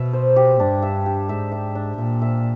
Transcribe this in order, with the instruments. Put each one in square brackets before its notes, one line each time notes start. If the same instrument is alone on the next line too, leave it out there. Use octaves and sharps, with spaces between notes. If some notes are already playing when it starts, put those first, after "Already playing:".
Already playing: [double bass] B2 [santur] E5
[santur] C5
G4
[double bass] G2 [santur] D4
[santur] E5
G4
[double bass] G#2 [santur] E5
[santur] E5
D4
[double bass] A#2 [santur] E5
[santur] E5